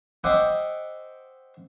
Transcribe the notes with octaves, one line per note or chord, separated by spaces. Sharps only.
C5 D#5 E5 F#5 G5 D6